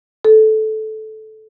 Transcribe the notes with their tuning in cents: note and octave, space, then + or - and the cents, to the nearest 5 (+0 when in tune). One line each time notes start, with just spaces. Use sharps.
A4 -15